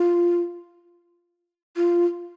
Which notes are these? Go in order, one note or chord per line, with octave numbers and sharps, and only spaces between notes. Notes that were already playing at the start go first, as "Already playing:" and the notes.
Already playing: F4
F4